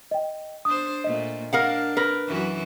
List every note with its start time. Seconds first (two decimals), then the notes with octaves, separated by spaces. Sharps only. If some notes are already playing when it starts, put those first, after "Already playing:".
0.11 D#5 G5
0.65 D4 C5 D#6
1.04 A#2 A3 D#5
1.53 D4 A#4 F5 F#5
1.97 A#4 B4
2.27 F#2 E3 F#4